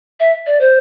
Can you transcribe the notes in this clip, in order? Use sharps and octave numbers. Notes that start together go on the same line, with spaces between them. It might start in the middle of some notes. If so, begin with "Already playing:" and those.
E5
D5
C5